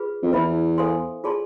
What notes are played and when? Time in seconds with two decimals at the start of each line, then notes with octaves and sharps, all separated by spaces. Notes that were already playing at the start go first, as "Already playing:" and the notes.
Already playing: F4 G#4 B4
0.23 F2
0.33 E2 E4 B4 E5 B5
0.78 A4 C5 F5 G#5 C6
1.24 F4 G#4 D5 A5 C6